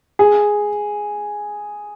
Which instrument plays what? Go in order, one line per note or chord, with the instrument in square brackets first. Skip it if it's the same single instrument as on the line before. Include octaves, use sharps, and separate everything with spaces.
[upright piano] G#4